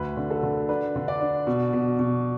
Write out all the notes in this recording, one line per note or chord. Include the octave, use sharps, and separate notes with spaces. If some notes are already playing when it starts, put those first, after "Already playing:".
Already playing: D2 B4
D3
A4
D3
D4 B4
D3
D5
D4
B2
B2
B2